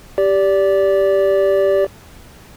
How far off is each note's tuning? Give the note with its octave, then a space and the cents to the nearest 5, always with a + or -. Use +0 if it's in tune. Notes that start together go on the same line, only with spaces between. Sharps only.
G4 +0 D5 -20